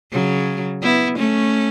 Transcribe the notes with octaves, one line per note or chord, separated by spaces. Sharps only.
C#3 F#3
B3 E4
A3 C#4